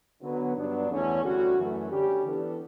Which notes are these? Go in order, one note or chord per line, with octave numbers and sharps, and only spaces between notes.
D3 F#3 B3
G2 F#3 B3 D4
E2 D3 A3 C#4
D2 D3 G3 C#4 F#4
F#2 E3 A3
D3 G3 C#4 G4
E3 B3 D4 A4